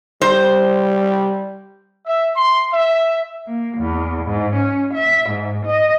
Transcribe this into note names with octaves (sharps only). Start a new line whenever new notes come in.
G3 C5
E5
C6
E5
A#3
E2
G#2
C#4
E5
G#2
D#5